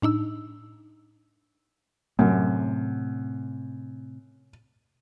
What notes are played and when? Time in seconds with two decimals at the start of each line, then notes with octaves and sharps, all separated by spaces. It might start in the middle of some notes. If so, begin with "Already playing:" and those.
0.02 A2 D4 D#4 E6
2.19 F#2 A2 C3